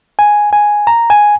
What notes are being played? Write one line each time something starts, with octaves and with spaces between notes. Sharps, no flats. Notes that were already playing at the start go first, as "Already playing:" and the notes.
G#5
G#5
A#5
G#5